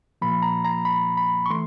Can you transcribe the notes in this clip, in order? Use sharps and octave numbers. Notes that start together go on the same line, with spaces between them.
A#2 F3 A#3 B5
A#5
A#5
B5
B5
C#6
E3 A3 C6